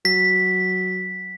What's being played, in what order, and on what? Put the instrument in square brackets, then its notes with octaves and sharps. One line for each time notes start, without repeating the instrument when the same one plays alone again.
[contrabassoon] F#3 [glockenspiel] B6